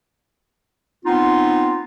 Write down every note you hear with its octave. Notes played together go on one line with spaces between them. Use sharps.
B3 C4 D#4 F4